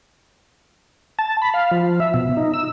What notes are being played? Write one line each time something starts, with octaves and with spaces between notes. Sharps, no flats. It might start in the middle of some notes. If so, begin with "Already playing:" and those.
A5
B5
F5
F3
E5
B2
D#4
E6